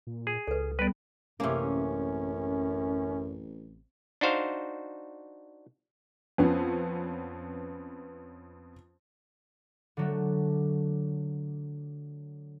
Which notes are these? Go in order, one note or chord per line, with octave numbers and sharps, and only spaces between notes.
A#2
G#4
C#2 A4 B4
G3 B3 B4 D5
A1 F#2 C3 A#3 C#4
D4 D#4 F#4 C5 F5
F2 B3 C#4
D3 F#3 A3